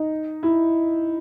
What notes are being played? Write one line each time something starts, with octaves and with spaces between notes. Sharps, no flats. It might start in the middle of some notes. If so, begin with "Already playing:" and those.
Already playing: D#4
E4